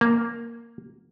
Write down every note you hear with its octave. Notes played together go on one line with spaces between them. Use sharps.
A#3